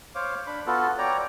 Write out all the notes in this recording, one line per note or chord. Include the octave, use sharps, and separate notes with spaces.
C5 C#5 F5 D6
D4 B5
B3 F4 F#4 A4
C#5 D5 G5 A#5